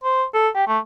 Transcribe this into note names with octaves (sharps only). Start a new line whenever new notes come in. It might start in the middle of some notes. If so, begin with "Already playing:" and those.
C5
A4
G4
A3